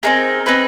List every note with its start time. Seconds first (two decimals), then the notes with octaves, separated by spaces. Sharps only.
0.03 C4 D#4 G#4 A#4
0.46 C4 D#4 G#4 B4